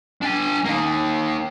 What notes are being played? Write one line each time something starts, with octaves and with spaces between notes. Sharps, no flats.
D4 G#5
A#3 D#4